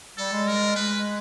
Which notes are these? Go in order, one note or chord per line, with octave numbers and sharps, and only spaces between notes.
G3 A4
G#3
A#4
G#3 B4